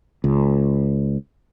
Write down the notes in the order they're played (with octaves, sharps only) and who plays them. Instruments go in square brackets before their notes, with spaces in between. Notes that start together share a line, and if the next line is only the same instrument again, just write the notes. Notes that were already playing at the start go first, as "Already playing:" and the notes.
[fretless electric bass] C#2